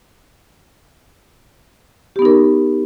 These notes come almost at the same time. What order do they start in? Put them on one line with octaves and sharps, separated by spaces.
G4 B3 D#4 A#4